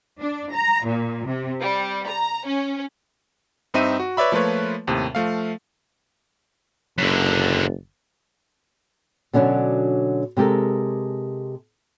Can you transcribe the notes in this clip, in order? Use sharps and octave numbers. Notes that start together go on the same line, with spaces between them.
D4
A#5
A#2
C3
G3
A#5
C#4
G2 C4 D#4 E5 D#7
F#4
B4 C#5 D5 E5 B5
F3 A3 A#3 F4 B4 C#5
D#2 A2 C3
F3 A3 F5
F#1 F#2 D3
B2 D3 F#3 C#4 D4
C3 G#3 G4 A4 A#4